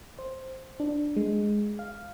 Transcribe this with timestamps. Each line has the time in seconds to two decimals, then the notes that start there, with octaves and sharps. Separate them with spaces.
0.19 C5
0.80 D4
1.17 G#3
1.79 F5